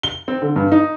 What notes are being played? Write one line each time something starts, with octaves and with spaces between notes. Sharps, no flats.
G7
C4
D3
G2
D#4